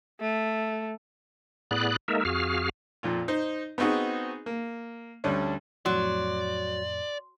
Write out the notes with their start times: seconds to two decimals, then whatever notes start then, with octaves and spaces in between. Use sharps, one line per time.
0.21 A3
1.71 A2 B3 G#4 D5 B5 F#6
2.08 G#3 A#3 D#4 A4 A#4 E5
2.25 F2 F#4 G#4 F5 F6
3.03 F2 A#2 F4
3.28 D#4 C5
3.78 B3 C4 D#4 F#4 G#4
4.46 A#3
5.24 D2 G3 C#4 D4
5.86 F2 A2 F#3 D5 C6